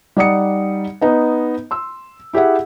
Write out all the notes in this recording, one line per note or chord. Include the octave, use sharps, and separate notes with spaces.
G3 D#4 D5 F#5 D#6 C#7
B3 D#4 B4
C6 E6
E4 G4 G#4 E5 F#5